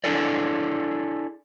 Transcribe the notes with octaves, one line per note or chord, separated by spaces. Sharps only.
D4 E4 G#4 A4 D5